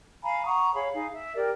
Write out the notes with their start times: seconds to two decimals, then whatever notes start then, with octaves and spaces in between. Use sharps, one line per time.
0.23 F5 G#5 A#5 B5
0.45 F#5 A#5 C#6 D#6
0.74 G#4 C#5 F5 B5
0.95 D#4 G#4 F5
1.14 E5
1.35 G4 A#4 D5